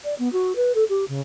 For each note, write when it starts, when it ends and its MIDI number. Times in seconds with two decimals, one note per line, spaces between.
0.04 0.14 74
0.18 0.31 59
0.32 0.53 66
0.55 0.72 71
0.74 0.84 69
0.89 1.04 67
1.08 1.20 49